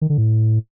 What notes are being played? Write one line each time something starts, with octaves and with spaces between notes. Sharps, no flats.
D#3
D3
A2